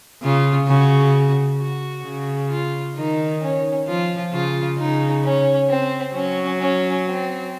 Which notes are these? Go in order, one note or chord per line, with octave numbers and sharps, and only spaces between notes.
C#3 F4
C#3 F#4
F#4
C#3
F4
D#3 D#4
C#4
F3 F4
C#3 F4
C#3 D#4
C#4
C4
F#3 C#4
C#4
C4